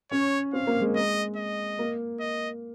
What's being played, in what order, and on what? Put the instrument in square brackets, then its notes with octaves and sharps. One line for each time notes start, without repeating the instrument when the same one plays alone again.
[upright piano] C#4 [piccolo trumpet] C#5
[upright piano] C4 [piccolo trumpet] F5
[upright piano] A#3
G#3
[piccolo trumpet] D#5
D#5
[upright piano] A#3
[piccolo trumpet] D#5